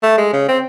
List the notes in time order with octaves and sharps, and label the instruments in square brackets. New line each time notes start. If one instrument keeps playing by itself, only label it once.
[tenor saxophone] A3
G#3
C#3
C4